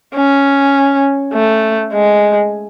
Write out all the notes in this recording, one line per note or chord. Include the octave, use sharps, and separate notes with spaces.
C#4
A3
G#3